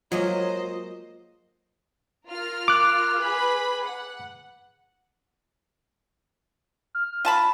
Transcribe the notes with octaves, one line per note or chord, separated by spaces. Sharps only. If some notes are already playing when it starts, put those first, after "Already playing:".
F#3 G#3 A#3 F4 C5 D#5
F4 A#4 F6
D6 F#6
G#4 B4 B5
F#5
F6
F4 A5 B5